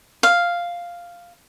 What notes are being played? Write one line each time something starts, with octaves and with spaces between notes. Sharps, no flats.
F5